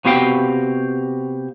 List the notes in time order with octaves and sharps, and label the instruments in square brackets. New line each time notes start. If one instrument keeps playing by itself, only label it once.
[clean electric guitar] C3 B3 F#4 G4 F5 G5